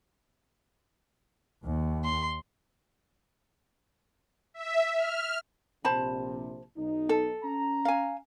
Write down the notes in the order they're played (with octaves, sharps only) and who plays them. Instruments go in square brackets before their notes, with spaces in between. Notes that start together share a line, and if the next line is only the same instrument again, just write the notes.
[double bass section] D#2
[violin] C6
[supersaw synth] E5
F6
[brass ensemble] A#1 C3 [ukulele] C5 A5 B5
[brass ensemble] B1 D#4
[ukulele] A4
[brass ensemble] C#4 A#5
[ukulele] F5 G#5